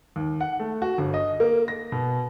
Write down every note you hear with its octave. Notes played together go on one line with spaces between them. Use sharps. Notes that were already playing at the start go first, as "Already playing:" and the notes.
D#2
F#5
A3
F#4
G1
D#5
A#3
A#6
B2